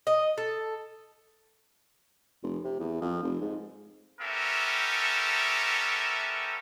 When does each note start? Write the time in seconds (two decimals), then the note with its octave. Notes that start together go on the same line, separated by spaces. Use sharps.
0.07 D#5
0.38 A4
2.43 F1
2.64 C3
2.80 E2
3.02 F2
3.22 F1
3.41 G#2
4.21 B3 C#4 G4 A4 A#4 E5